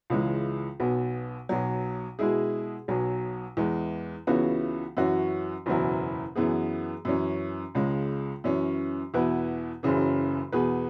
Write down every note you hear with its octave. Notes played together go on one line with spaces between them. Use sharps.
C#2 C#3 E3 G#3
B1 B2 B3
B1 B2 F#3
B2 G#3 E4 G#4
B1 B2 F#3
E2 E3 G#3
C#2 C#3 E3 B3 F#4
F#2 E3 C#4 F#4
F#1 E2 B2 F#3 E4
F#2 E3 B3 G#4
F#2 E3 C#4
C#2 C#3 G#3
F#2 E3 C#4
E2 B2 B3 E4 B4
F#1 F#2 C#3 E3
E2 B2 B3 G#4 B4